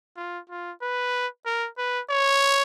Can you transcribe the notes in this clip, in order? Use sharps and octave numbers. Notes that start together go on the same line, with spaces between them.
F4
F4
B4
A#4
B4
C#5